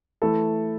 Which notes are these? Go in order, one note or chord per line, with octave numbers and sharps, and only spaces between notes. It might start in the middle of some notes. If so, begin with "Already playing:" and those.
E3 A3 E4 A4